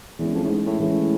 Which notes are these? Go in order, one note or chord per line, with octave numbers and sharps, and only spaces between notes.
E2 E3 G#3 C#4
F2
A2
G#2
A2
A2 E3 G#3 C#4